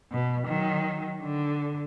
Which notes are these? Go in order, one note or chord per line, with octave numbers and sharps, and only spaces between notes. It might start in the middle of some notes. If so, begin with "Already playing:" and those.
B2
D#3 F#3
D3